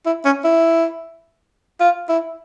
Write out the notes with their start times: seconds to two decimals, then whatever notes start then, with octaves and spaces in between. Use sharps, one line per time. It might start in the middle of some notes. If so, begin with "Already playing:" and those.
0.06 E4
0.25 C#4
0.44 E4
1.80 F4
2.09 E4